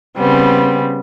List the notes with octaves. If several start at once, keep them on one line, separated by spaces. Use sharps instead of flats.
C#3 G3 B3 C4